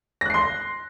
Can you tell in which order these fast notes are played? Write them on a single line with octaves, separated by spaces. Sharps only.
A#6 F#6 C7 C6